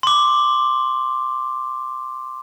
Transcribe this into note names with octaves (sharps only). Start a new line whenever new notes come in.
C6 D6